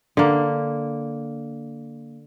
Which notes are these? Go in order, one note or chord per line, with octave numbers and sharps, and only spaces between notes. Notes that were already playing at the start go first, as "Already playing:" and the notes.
D3 A#3